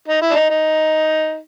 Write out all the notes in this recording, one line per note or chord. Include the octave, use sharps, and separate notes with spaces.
D#4
E4
D4
D#4
D#4